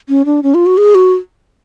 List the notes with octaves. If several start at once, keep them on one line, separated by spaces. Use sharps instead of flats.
C#4
D4
C#4
F4
F#4
G#4
F#4